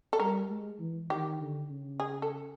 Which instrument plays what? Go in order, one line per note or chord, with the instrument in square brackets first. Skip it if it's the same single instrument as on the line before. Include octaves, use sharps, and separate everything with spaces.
[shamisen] A4
[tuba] G3 [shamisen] A#4
[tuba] G#3
E3
[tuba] D#3 [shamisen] G4
[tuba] D3
C#3
[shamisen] G#4
A4